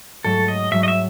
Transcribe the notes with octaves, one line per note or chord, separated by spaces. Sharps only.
G#2 F#3 A3 A4
D#5
G#2 F#3 A3 E5
D#5
E5